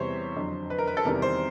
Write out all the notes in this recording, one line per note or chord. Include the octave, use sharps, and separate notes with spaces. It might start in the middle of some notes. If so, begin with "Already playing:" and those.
Already playing: E2 C3 E3 G3 C5 C#5
F2 D3 F#3
B4
A#4
B4
A4
E2 C3 D#3 G3 A#4
C5